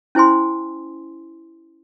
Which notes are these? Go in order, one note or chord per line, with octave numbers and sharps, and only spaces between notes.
C#4 E4 C5 G#5 C6